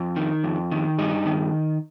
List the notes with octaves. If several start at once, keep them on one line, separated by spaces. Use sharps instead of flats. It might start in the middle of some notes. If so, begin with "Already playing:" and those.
Already playing: F2
D#3
F2
D#3
G2 D#4
D#3